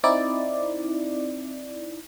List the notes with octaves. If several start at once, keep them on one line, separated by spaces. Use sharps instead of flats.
C4 D#4 E4 D5